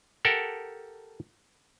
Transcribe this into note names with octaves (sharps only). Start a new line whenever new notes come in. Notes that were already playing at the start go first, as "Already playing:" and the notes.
G4 A4 A#4 F#5 G5 A5